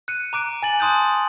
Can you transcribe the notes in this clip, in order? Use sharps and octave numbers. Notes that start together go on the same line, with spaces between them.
F#6 C#7 D#7
A#5 D6 F#6 D7
G#5 A6 F#7
A5 C6 D#6 F#6 G6